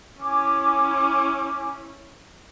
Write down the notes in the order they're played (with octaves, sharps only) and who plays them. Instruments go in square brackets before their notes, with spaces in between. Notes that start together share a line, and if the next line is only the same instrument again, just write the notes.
[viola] C#4 E4 [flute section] G#5 D6